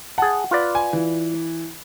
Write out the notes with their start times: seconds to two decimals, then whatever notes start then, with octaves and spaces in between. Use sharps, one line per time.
0.18 G#4 F#5 A5
0.51 F4 B4 D5
0.75 G#5
0.93 E3